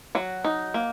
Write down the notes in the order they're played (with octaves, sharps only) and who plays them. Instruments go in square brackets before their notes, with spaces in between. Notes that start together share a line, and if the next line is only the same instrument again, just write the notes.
[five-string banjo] F#3 F#4
D#4
A#3